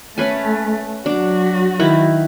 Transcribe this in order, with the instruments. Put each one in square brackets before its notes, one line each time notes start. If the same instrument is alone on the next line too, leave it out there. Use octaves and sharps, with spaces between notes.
[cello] A3 [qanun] C#4 B4 G#5
[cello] F#3 F#4 [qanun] D4
[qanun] D#3 E4 B4